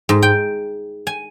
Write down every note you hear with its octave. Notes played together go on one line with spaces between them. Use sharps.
G#2
G5
G#5